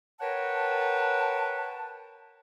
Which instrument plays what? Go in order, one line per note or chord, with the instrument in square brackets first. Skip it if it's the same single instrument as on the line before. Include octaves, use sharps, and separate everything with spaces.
[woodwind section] A#4 B4 C#5 F#5 G5 A5